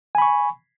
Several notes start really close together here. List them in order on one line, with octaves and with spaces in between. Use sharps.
G#5 B5 C#6